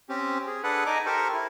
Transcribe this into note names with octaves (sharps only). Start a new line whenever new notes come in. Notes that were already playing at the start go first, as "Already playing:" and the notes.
C4 C#4 G4
G#4
D4 G#4 A4 B4 F#5 F#6
D#4 D#5 G#5 A#5 D6
G4 A4 A#4 C5 C#6
E4